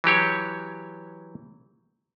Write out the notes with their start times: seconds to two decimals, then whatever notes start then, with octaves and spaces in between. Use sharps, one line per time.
0.04 E3 F#3 G4 C#5